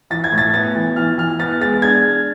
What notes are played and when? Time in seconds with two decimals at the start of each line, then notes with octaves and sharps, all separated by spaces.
0.10 E3 A6
0.24 G#6
0.32 A2
0.38 A6
0.54 B3 A6
0.75 E3
0.96 E3 F6
1.18 E3 F6
1.39 B3 A6
1.61 G#3 A6
1.82 D4 G#6